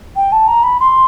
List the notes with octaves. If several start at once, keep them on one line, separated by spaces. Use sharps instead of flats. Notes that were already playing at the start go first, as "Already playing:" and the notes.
G5
A5
A#5
B5
C6